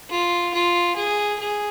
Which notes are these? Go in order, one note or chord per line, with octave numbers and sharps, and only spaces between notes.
F4
F4
G#4
G#4